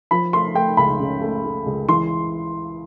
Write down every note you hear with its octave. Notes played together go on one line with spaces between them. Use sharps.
F3 B5
A3 C6
A3 G5
C#2 B5
C#3
A3
A3
C#2
E3 C6